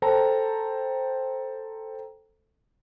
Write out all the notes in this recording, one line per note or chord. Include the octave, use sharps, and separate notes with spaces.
A4 C5 G5 A5 A#5